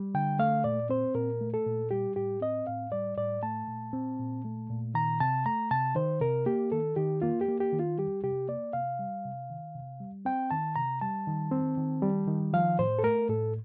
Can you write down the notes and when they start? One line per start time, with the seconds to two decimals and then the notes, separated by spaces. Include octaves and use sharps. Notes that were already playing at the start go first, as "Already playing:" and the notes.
Already playing: G3
0.14 D3 G5
0.39 A3 F5
0.64 A#2 D5
0.89 C4 C5
1.15 A#2 A#4
1.41 A3
1.54 A4
1.66 A#2
1.91 G3 G4
2.16 A2 G4
2.41 C4 D#5
2.67 A2 F5
2.92 G3 D5
3.17 A2 D5
3.43 A3 A5
3.68 A#2
3.93 C4
4.19 A#2
4.45 A3
4.70 A#2
4.94 D#3 A#5
5.20 C3 A5
5.46 A3 A#5
5.71 C3 A5
5.95 D#3 C5
6.21 C3 A#4
6.46 A#3 G4
6.72 D#3 A4
6.96 D#3 G4
7.22 A#3 F4
7.41 G4
7.48 A#3
7.60 G4
7.73 D#3
7.79 F4
7.98 G3 G4
8.24 C3 G4
8.48 A#3 D5
8.73 C3 F5
8.99 G3
9.25 C3
9.50 D#3
9.74 C3
10.00 G3
10.25 C4 G5
10.51 D#3 A5
10.76 C3 A#5
11.01 G3 A5
11.27 D#3
11.52 C4
11.78 D#3
12.02 G3
12.27 D#3
12.53 F3 F5
12.79 A2 C5
12.99 A4
13.04 A3 A#4
13.29 A2 A4